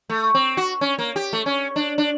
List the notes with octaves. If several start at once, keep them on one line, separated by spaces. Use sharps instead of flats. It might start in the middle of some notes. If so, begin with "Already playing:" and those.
A3
C4
F#4
C#4
A#3
G4
A3
C#4
D4
D4